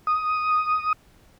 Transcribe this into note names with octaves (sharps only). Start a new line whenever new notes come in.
D#6